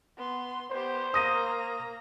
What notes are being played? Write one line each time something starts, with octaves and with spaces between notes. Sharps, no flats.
B3 C6
B3 G4 C5
A#3 A#5 D#6 A#6 D#7